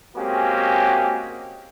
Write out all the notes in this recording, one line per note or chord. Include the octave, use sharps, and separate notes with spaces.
G#3 A#3 C4 C#4 F#4 G4